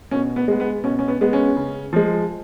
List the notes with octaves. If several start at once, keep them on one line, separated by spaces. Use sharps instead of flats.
B2 C#4
B3
G#3 B3
B3
B2 C#4
C#4
B3
G#3 B3
C#4
C#3
F3 G#3